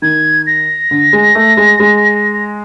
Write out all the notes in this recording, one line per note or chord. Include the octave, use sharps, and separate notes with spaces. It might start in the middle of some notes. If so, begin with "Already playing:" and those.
D#3 G#6
A#6
D3
G#3
A3
G#3
G#3